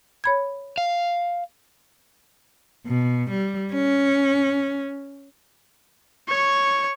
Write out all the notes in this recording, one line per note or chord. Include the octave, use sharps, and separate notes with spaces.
C#5 B5 G#6
F5
B2
G3
C#4
C#5 C#6